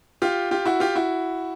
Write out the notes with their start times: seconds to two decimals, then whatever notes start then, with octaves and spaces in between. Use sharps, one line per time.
0.22 F4 G4
0.51 F4 G4
0.65 E4 F#4
0.80 F4 G4
0.96 E4 F#4